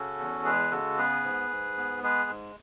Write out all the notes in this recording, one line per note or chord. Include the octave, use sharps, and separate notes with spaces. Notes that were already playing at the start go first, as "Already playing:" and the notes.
Already playing: C#3 C#4 F#4 A4
E2
G#3 G#4 B4
C#3 F#4 A4
B3 G#4 B4
G#2
G#2
B3
G#3 G#4 B4
G#2